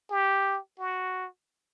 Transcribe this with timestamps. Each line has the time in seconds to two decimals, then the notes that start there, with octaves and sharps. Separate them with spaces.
0.10 G4
0.79 F#4